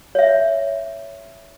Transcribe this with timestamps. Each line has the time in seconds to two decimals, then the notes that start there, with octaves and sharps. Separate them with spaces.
0.15 C#5 E5